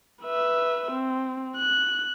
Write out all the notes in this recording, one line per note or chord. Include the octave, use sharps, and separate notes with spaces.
B4 E5
C4
F#6